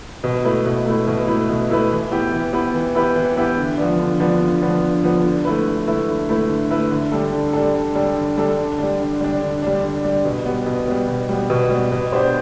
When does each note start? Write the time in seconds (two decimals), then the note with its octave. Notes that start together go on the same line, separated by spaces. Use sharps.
0.24 B2
0.44 A3 E4 B4
0.66 B2
0.86 A3 E4 B4
1.08 B2
1.28 A3 E4 B4
1.49 B2
1.70 A3 E4 B4
1.91 E3
2.11 B3 E4 G4 B4
2.32 E3
2.53 B3 E4 G4 B4
2.74 E3
2.95 B3 E4 G4 B4
3.16 E3
3.36 B3 E4 G4 B4
3.58 D3
3.78 F3 B3 D4
3.99 D3
4.20 F3 B3 D4
4.41 D3
4.62 F3 B3 D4
4.82 D3
5.03 F3 B3 D4
5.24 D3
5.45 A3 E4 B4
5.66 D3
5.87 A3 E4 B4
6.08 D3
6.29 A3 E4 B4
6.49 D3
6.71 A3 E4 B4
6.91 D3
7.12 G3 D4 A4
7.33 D3
7.53 G3 D4 A4
7.75 D3
7.95 G3 D4 A4
8.16 D3
8.37 G3 D4 A4
8.58 D3
8.78 G3 D4
9.00 D3
9.21 G3 D4
9.41 D3
9.62 G3 D4
9.83 D3
10.04 G3 D4
10.25 B2
10.45 G3 B3
10.66 B2
10.87 G3 B3
11.08 B2
11.29 G3 B3
11.50 B2
11.71 G3 B3
11.92 B2
12.12 B3 D4 G4 C5